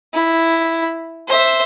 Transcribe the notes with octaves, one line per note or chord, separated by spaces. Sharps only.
E4
C5 E5